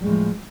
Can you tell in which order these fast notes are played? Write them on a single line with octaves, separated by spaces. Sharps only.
G3 G#3 A2 F3